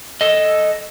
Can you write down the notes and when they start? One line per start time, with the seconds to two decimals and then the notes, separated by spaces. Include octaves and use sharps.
0.21 A4 D#5